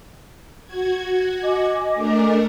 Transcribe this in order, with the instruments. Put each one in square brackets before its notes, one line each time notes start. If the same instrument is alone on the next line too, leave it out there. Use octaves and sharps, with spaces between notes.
[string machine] F#4 G#6
[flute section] D#5 G#5 D6
[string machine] A3 D4 A#4